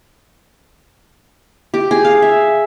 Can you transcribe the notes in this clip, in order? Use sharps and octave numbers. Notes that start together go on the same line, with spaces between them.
G4
G#4
F5
E5